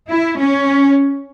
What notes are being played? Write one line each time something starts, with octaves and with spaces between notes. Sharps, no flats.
E4
C#4